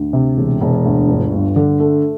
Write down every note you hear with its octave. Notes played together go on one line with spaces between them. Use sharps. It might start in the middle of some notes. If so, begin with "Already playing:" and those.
Already playing: D2
C3
E1
E1
D2
G1
G2
D3
A3